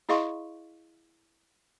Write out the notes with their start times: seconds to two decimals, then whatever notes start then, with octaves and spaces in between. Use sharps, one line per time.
0.09 E4 G#4 D#5 F5 C6 C#6